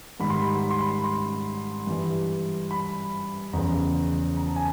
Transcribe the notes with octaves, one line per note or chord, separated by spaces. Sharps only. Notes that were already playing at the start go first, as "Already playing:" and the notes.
G#2 D#3 G3 B5
C6
B5
C6
B5
C6
B5
C6
G2 E3 G3
B5
E2 C#3 F3 A#5
A#5
A5
G#5